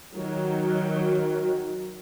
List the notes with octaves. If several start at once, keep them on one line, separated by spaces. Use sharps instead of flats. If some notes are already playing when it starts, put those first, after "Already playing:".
D#3 F#3